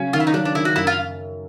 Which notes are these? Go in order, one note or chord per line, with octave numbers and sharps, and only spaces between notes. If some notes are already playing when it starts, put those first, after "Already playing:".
Already playing: C#3 F#3 C#4
D#3 F4
E4
D#4
F#3 D4
D4
D#3 E4
F#4
F#2 E4
F4